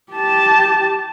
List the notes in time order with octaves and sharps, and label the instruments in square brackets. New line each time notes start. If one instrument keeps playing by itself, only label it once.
[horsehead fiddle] G4 A5